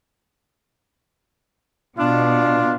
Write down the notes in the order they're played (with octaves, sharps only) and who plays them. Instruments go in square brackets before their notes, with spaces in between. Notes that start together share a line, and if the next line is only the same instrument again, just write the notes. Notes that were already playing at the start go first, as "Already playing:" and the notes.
[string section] B2 [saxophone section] D4 [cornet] F4